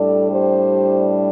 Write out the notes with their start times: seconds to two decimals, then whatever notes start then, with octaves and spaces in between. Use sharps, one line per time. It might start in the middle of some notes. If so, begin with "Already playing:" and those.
Already playing: A2 G3 D4 A4 D5
0.31 G4 C5